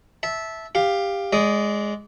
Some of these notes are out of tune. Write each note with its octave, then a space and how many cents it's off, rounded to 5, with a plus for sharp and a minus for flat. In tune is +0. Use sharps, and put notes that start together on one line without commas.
E5 -10 A5 -10
G4 +15 F5 +0
G#3 +0 D5 -25 D#6 +0